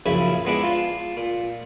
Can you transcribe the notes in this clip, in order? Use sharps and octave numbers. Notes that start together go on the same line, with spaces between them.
A#1 F#2 C#3 E4 E5
G#3 B3 D4 E4 D6
F4 A5
A#2